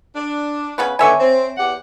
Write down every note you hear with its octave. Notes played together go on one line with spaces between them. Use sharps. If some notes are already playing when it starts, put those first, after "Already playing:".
D4
C#3 B3 B4
D3 D#3 B3 C#5 E5 G#5
C4
E2 G4 F#5